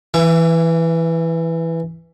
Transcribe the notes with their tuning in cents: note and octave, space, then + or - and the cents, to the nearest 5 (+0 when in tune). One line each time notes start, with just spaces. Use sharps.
E3 +0 E5 +35